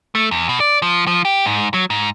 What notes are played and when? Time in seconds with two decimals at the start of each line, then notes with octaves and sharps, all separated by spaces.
0.15 A3
0.31 E2
0.49 B2
0.60 D5
0.82 F3
1.07 F3
1.25 G4
1.46 G#2
1.74 F#3
1.90 G#2